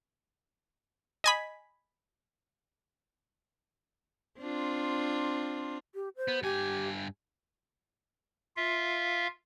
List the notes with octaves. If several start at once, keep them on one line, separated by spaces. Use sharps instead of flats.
D#5 G#5 B5
C4 D4 F4
G4
C5
B3
G2 G4 G#5
F4 E5 F5